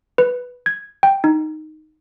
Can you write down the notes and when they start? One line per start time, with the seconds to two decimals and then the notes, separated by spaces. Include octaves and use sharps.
0.18 B4
0.66 G#6
1.03 G5
1.24 D#4